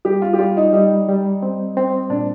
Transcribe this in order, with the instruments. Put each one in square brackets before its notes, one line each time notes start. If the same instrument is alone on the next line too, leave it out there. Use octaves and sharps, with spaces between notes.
[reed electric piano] G3 [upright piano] G4
[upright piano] F4
G4
[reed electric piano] G3 [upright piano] F4
[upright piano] D#4
[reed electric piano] G3 [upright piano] D#4
[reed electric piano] G3
C4
C4
[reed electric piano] A#2 [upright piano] D4